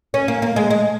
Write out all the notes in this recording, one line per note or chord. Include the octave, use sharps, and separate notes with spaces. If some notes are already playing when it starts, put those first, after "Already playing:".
C#4
A#3
A#3
G#3
G#3